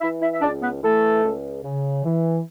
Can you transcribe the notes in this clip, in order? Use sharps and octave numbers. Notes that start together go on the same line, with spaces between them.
E3 E4 E5
E4 E5
E5
C#2 D4 D5
B3 B4
E3 A3 A4
C#2
C#3
E3